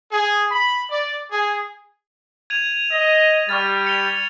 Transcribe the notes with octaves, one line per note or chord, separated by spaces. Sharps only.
G#4
B5
D5
G#4
G#6 D#7 F7
D#5
G3 C#6 F6 A6
C#7 F7 G7